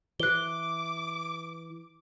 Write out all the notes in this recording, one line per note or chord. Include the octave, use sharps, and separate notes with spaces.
E3 D6 F#6 G7